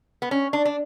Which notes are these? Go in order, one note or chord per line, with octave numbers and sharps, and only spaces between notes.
B3
C#4
D4
D4